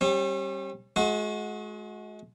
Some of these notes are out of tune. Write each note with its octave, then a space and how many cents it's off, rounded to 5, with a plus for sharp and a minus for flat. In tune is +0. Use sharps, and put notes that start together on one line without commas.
G3 +0 C#4 -40
G#3 +35 F#4 -20